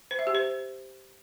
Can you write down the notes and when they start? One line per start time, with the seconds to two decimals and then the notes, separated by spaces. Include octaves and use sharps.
0.11 C5
0.19 E5
0.27 G4
0.35 C5